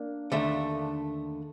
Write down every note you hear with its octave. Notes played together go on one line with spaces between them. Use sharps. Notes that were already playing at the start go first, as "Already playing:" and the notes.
Already playing: A#3 D4
D#2 D3 A3